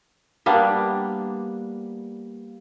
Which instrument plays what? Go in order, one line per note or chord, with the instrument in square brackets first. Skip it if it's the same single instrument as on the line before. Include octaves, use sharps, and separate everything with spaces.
[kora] G3 A#3 B3 D4